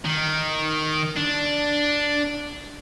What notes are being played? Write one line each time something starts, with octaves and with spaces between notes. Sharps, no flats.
D#3
D4